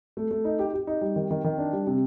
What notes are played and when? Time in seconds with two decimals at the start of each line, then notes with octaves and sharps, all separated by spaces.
0.17 A3
0.31 A3
0.45 D#4
0.59 G4
0.74 G4
0.87 D#4
1.01 G3
1.16 D#3
1.31 D#3
1.44 D#3
1.58 D4
1.73 G3
1.87 C3